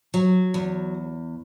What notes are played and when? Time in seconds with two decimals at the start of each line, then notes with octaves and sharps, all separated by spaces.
0.14 F#3
0.54 E2